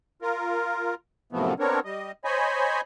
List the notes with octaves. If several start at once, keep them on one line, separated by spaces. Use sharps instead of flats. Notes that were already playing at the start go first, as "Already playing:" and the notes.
F4 A#4
F#2 A2 C3 F3 A3 B3
B3 C4 D4 A#4 C#5
G3 D#5
C5 C#5 D#5 G#5 B5